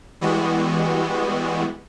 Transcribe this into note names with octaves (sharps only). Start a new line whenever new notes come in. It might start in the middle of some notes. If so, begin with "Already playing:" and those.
E3 G3 G#3 B3 F#4